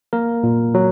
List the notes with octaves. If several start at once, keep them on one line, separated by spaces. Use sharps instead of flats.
A#3 A#4
A#2
F#3